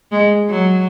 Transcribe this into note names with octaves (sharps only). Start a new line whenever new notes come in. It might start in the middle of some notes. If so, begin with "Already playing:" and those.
G#3
F#3